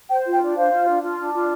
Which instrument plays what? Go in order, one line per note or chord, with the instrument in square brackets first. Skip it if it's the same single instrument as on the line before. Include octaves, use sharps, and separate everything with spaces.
[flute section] C5 [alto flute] G5
[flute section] F4
[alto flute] G5
[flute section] D4
[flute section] C5 [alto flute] F5
[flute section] F4
D4
F4
D4
F4